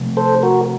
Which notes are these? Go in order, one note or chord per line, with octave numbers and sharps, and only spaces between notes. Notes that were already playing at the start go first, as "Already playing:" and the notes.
Already playing: C3 F3 A3
A4 C5
F#4 A#4